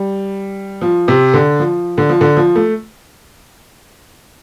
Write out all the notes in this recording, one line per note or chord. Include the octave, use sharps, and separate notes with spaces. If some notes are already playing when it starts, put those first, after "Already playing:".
Already playing: G3
F3
C3
D3
F3
D3
F3
D3
F3
A3